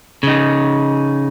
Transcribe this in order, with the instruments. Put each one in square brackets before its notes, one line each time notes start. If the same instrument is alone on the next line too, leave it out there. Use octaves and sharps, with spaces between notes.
[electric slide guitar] C#3 D#4